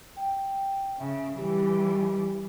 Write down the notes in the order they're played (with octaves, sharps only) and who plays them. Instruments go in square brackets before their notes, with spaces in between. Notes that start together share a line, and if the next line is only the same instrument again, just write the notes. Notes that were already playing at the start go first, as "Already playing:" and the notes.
[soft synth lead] G5
[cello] C#3 [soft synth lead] E5
[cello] E3 G3 [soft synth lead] G4